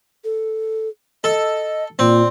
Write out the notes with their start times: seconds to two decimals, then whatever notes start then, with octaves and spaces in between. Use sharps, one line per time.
0.24 A4
1.24 A4 D#5
1.99 A#2 C4 D5